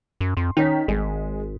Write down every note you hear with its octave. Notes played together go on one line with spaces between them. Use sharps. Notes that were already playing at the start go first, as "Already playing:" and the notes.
F#2
F2 C6
D#3 C#4 D#4 B6
G#1 G#3